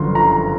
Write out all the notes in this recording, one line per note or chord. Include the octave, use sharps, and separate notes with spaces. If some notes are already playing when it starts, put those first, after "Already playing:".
Already playing: G1 F#2 D3 F3 C6
A#5